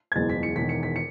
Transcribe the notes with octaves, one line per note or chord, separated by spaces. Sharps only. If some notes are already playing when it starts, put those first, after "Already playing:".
G#6
F#1 E2 B2 G#3 A6
B6
C#7
E1 E2 D#3 B6
C#7
B6
C#7